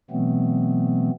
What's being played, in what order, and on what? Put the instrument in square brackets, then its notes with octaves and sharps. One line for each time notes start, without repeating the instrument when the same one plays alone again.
[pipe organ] B2 E3 F#3 A3 B3 C4